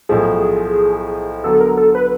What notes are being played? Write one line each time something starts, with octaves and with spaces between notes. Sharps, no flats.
B1 A2 F3 G#4
D3 F#3 B3 A4
A#4
A4
B4